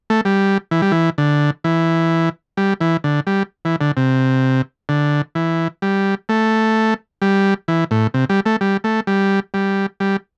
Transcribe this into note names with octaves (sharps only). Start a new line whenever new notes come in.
A3
G3
E3
G3
E3
D3
E3
G3
E3
D3
G3
E3
D3
C3
D3
E3
G3
A3
G3
E3
A2
C3
G3
A3
G3
A3
G3
G3
G3